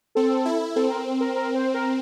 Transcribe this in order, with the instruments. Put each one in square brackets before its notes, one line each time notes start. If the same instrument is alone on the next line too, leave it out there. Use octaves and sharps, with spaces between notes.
[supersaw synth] C4 [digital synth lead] A4
[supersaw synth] E4
[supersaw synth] C4 [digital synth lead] A4
[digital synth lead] A#4
A#4
A#4
C5
A#4